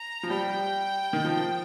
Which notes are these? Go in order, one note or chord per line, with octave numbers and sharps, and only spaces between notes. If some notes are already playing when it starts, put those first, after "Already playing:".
Already playing: A#5
F3
G3 G5
D#3
F3